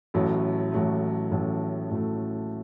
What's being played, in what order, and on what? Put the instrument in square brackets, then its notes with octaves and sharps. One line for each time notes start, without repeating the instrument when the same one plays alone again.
[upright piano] A1 A2 F#3 A3
A1 A2 F#3 A3
A1 A2 F#3 A3
A1 A2 F#3 A3